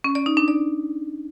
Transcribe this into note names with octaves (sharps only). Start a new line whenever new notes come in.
C#4
D5
D#4
D4
D5